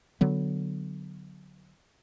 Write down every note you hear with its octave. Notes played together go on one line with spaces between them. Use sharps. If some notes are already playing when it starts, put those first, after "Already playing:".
D3 F#3 B3